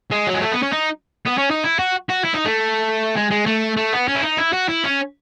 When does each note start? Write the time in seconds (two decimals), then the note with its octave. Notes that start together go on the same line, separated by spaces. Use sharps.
0.11 G#3
0.27 F#3
0.34 G#3
0.42 A3
0.52 B3
0.62 C#4
0.72 D#4
1.26 B3
1.38 C#4
1.51 D#4
1.64 E4
1.79 F#4
2.10 F#4
2.25 E4
2.34 D#4
2.45 A3
3.16 G#3
3.31 G#3
3.46 A3
3.77 A3
3.93 B3
4.08 C#4
4.15 E4
4.23 D#4
4.38 E4
4.53 F#4
4.68 E4
4.84 C#4